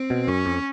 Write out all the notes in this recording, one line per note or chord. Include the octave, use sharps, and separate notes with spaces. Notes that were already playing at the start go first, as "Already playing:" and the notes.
Already playing: C4
B2
F#2 C#4
F2